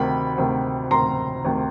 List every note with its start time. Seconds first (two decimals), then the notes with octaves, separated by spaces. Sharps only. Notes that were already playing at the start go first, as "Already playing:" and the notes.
Already playing: D2 C3 D#3 B5
0.38 D2 C3 D#3
0.91 D2 C3 D#3 A#5 C6
1.45 D2 C3 D#3